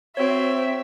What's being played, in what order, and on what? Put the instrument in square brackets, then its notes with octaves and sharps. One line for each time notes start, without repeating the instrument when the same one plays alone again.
[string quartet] C4 [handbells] F#4 C#5 [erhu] E5